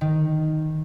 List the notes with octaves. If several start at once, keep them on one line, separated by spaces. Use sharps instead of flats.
D#3